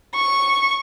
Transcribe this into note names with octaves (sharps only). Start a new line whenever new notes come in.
C#6